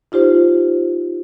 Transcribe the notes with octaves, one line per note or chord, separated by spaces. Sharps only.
D#4 F4 G4 C5